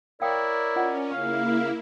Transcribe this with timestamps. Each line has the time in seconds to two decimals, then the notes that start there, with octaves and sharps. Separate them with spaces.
0.22 E4 A#4 C#5 D5 F5 G5 D#6
0.76 C#4 F4 D#5 F#5
1.12 C#3 A#3 E4 F5 C#6